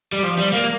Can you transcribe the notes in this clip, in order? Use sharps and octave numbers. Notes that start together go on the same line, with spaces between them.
G3
F3
G3
A#3